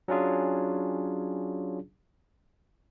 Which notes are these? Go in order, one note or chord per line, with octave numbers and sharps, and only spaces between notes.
F#3 C#4 D4 F4 G#4